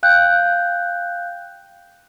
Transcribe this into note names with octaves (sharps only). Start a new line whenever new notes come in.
F5 G5 F#6 G6